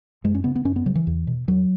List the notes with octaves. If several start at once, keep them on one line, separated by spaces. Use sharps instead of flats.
F#2 G#3
C#4
C#3 B3
B3
F#2 C#4
B3
C#3 F#3
E3
E2
B2
E2 F#3